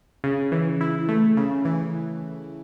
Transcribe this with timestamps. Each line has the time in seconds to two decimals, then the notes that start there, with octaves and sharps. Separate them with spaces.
0.24 C#3
0.52 E3
0.81 E4
1.09 A3
1.37 C#3
1.65 E3